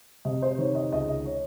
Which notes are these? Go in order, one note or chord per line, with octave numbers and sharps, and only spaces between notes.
C3 D#5
C5
D#3 C#5
D#5
C#2 D#5
C#5